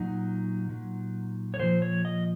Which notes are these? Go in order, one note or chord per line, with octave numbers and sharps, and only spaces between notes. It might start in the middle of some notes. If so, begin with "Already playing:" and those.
Already playing: A#2 F#3 D#4
A#2 F#3
C#5
A#2 F3 C5
C#5
D#5